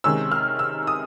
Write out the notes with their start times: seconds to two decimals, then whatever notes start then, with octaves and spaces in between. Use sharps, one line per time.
0.04 C3 D#3 G#3 C#4 E6
0.32 F6
0.59 E6
0.87 D#6